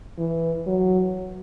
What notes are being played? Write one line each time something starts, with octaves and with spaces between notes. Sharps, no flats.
E3
F#3